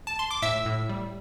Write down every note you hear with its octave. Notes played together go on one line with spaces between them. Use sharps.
A5
C6
D6
A2 E5 E6
A2
G3